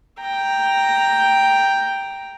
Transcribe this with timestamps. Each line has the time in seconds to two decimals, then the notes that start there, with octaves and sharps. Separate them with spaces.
0.21 G5 A#5